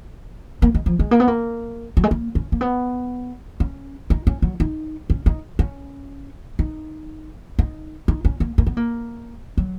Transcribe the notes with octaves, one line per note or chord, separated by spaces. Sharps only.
A#3
G#3
F3
G#3
A#3
B3
A#3
F#3
G#3
A#3
C#4
A#3
B3
C#4
D#4
C#4
F#3
D#4
C#4
D#4
C#4
D#4
D#4
D#4
C#4
A#3
A#3
B3
A#3
F#3